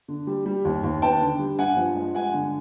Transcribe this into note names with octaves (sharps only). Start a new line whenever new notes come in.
D3
G3
G3
D#2
D#2
B3 G5 A5
D3
G3
G2 F#5 G#5
F3
G#3
G2 F#5 G#5
D3